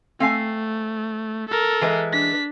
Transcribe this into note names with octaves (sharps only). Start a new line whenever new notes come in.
A3 C4 F5 G#5
A4 A#4
E3 G#3 B4
D4 B6